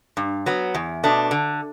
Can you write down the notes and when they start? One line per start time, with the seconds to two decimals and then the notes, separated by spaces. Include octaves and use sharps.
0.17 G2
0.46 F#3 B3
0.75 E2
1.04 B2 A3 D4
1.31 D3